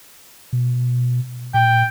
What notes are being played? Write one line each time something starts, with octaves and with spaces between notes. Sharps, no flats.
B2
A#2 G5